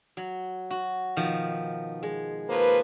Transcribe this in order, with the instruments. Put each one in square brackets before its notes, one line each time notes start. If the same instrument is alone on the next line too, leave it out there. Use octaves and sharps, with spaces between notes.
[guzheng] F#3
F#4
B2 D#3 F3
G#3
[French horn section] F3 A#3 B4